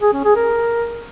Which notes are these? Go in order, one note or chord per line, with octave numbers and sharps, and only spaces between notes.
G#4
C#4
G#4
A#4